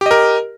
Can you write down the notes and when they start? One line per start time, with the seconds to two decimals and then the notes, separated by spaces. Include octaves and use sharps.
0.01 G4
0.06 D#5
0.11 A#4